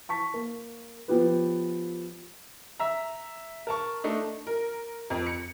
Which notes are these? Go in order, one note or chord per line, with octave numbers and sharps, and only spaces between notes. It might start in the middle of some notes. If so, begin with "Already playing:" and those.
A5 C#6 B6
A#3
F3 B3 G4 B4
E5 A#5
A#4 A5 C#6
A3 D4 D#4
A#4
F2
C#7